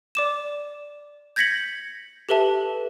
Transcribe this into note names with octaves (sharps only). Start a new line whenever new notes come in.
D5 D6 E7
G6 G#6 A#6 B6 C#7 F#7
G4 A4 B4 E5 A5